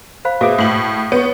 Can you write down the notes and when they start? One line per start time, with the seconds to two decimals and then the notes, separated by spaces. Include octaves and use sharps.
0.25 C5 F5 B5
0.41 B2 G#4 E5 F5
0.58 A2 F#7
1.12 B3 C#5 C#6